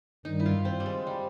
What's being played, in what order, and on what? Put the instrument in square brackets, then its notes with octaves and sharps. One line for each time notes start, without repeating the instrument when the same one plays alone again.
[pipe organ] G2 D#3 G3 [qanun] D#4
[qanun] E4
F4
C4
G3
G#3
G3